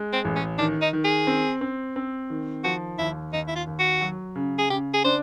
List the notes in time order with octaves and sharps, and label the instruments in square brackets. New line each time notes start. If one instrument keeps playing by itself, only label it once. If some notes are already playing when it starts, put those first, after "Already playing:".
Already playing: [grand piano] G#3
[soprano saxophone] C4
[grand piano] A1
[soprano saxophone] C#4
[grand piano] D#3 [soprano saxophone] D4
[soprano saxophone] D#4
[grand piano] D#3
[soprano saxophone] G#4
[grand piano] C4
C4
C4
D#3
[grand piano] F3 [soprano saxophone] F#4
[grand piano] D#2 [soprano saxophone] E4
[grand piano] D#2 [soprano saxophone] D#4
[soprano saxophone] E4
F4
[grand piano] D#2
[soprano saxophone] F#4
[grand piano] F#3
C#3
[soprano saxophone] G#4
[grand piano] C#3 [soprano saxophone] G4
[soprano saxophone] G#4
[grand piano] D4 [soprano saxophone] C5